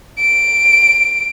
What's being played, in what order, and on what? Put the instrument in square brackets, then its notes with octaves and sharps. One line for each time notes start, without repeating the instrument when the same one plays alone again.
[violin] D7